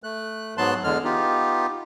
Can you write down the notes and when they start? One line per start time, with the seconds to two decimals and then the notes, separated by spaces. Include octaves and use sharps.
0.03 A3 F#6
0.58 G#2 F#3 B3 A5 C6 F#6
0.84 E2 D3 G#3 F6
1.04 B3 D#4 F4 G4